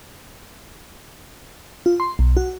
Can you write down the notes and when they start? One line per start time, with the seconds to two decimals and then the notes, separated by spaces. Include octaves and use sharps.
1.86 F4
2.00 C6
2.19 B1
2.37 F#4